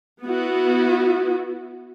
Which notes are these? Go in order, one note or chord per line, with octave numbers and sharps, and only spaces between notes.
B3 E4 F#4